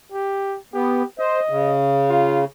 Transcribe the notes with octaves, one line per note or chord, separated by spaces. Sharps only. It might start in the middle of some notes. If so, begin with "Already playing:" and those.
G4
B3 G4
C5 D#5
C#3
F4